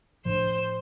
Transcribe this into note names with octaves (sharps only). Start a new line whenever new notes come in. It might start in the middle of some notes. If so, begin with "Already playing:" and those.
A2 F3 A3 D4 C5